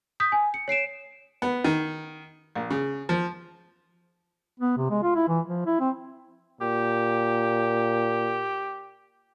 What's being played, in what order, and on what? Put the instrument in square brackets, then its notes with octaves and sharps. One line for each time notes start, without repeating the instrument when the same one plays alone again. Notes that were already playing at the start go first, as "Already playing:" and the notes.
[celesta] D#6 G6 B6
G#5
C#7
C#5 C7 D7 E7
[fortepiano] B3
D#3
A#1
C#3
F3
[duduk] B3
C3
G#3
F4
E4
E3
F3
E4
C4
[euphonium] A#2 [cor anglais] G4